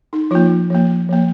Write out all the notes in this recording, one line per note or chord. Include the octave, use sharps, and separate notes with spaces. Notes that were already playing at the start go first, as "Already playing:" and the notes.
D#4
F3 A#3 F4
F3 A#3
F3 A#3